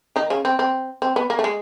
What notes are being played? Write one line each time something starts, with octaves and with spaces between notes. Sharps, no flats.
D#3 D#4
C#3 C#4
C4
C4
C4
B3
A#3
A3
G#3